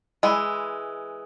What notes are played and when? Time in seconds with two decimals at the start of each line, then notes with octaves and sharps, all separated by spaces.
0.23 E3 G#3